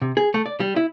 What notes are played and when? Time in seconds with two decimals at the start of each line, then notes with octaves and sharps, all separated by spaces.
0.02 C3
0.17 G#4
0.34 A3
0.46 D5
0.60 G3
0.76 E4